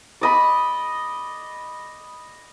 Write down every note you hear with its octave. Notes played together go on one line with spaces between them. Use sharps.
D5 D#5 B5